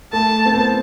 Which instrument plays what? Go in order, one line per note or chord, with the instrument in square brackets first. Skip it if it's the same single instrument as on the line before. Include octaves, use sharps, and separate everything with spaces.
[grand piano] A3 [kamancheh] A5
[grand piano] C4
B3